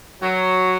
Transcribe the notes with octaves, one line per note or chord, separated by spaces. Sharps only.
F#3